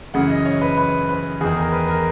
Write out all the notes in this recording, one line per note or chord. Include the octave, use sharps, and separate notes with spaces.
F#2 C#3 E3 F#5
D#5
C#5
B4
B4
B4
E2 D#3 G#4
A#4
B4
A#4